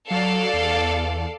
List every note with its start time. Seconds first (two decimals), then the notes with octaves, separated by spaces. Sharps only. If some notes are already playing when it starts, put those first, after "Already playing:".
0.11 F#3 A4 D5 F5
0.53 E2